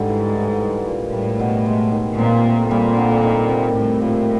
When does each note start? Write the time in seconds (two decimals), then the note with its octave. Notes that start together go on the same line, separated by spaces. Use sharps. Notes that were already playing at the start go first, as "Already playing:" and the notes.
Already playing: G#2 D3 G3
0.09 E3
0.35 A2
0.60 G3
0.87 A#2
1.13 A2 G3
1.39 B2
1.66 G#3
1.92 D#3
2.18 A#2 C4
2.45 A3
2.71 A#2 G3
2.97 D3
3.23 D#3
3.49 C3
3.75 A2 G3
4.01 A#2